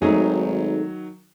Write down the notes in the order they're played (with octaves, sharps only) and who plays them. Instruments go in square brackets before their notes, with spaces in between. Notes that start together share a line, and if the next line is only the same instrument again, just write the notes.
[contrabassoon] G#1 [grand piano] D#3 F#3 [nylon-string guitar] A3 D#4 G#4